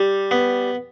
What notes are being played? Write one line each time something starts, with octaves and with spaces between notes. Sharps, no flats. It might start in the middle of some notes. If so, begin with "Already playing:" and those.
Already playing: G3
B3